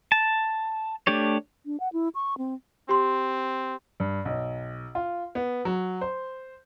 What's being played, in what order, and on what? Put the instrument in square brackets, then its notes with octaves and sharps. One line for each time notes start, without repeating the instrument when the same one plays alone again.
[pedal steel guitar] A5
A3 D4 G4 C#5
[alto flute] D4
F#5
E4
C#6
C4
[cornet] C4 [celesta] G4 C6
[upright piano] G2
B1
F4
B3
F#3
C5